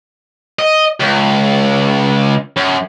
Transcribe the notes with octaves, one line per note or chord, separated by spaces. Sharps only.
D#5
C#2
F#2